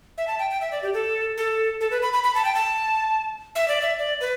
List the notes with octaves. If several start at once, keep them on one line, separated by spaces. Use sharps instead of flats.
E5
A5
G5
G5
E5
D5
G4
A4
A4
A4
B4
B5
B5
B5
A5
G5
A5
E5
D5
E5
D5
B4